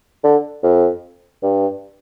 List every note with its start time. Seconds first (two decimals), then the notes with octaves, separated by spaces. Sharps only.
0.23 D3
0.63 F2
1.43 G2